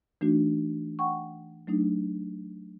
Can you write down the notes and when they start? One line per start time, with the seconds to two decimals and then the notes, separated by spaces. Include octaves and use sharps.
0.21 E3 A3 D4 D#4 F#4
0.99 F#5 G5 C#6
1.67 F#3 A3 D4 D#4